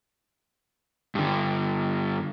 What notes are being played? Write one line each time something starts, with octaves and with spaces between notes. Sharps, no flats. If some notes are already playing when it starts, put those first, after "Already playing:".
G2 D3